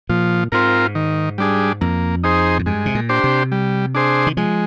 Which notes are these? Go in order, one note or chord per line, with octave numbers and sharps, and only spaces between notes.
A#2 F3
G#2 C4 F4 A#4
D#3
G3 D4 G#4
F2 A#3
D#4 G#4 C5
G#2
G2 G#3
C3
A#2
D4 G4 C5
C3
G3
D4 G#4 C5
D#3
F3 G#3